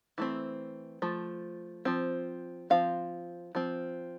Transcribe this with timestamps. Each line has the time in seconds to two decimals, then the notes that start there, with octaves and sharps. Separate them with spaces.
0.18 E3 A3 C4
1.02 F3 A3
1.85 F3 C4
2.70 F3 C4 F5
3.55 F3 C4